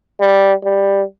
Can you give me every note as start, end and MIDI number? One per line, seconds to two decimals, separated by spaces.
0.20 0.53 55
0.64 1.02 55